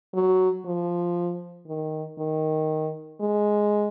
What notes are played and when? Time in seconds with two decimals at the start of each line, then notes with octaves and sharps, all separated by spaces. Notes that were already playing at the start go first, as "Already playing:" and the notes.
0.14 F#3
0.66 F3
1.67 D#3
2.19 D#3
3.21 G#3